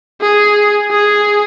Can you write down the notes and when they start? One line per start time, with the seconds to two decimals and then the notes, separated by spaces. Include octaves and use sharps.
0.22 G#4
0.91 G#4